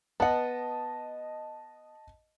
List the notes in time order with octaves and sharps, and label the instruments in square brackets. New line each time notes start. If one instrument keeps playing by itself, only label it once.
[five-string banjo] B3 F#5 [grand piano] D#5 A5